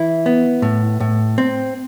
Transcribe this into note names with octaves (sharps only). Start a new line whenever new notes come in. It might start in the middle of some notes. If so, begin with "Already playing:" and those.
Already playing: E3 E4
B3
A2
A2
C4